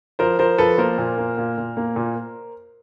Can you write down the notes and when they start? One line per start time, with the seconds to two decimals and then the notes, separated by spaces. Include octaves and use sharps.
0.19 F3 A#4 C5
0.39 F3 A#4 C5
0.58 F3 A4 B4
0.78 A#3 A#4 C5
0.98 A#2
1.18 A#3
1.38 A#2
1.58 A#2
1.77 A#3
1.96 A#2